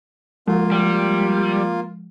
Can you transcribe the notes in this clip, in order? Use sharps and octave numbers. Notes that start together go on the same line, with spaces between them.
F3 G#3 A#3 F4
G3